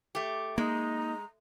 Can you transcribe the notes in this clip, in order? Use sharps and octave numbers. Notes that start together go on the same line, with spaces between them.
A3 G4
G#3 A#3 D#4 A#5